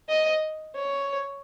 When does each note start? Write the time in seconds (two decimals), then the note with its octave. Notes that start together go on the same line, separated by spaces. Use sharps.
0.09 D#5
0.75 C#5